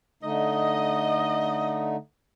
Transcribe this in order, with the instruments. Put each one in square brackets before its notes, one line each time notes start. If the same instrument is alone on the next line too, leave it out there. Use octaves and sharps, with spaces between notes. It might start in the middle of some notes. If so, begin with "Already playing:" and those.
[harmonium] D3 A3 D#4 [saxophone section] D#5